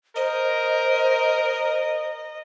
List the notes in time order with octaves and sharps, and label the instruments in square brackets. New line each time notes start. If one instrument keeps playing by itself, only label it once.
[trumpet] A#4 [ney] C5 [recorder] D#5